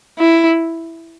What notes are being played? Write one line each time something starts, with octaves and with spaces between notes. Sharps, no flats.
E4